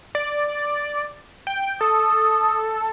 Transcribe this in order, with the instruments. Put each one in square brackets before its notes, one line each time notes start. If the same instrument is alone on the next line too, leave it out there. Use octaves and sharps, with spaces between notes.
[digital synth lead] D5
G5
[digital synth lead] A4 [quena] D#6